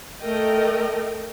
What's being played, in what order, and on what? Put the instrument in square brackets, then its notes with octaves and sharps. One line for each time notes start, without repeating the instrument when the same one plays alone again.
[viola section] A3 A4 A#4 D#5 G5